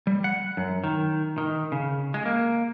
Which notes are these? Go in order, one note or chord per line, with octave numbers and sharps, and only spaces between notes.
G3
F#5
F#2
D#3
D#3
C#3
G#3
A#3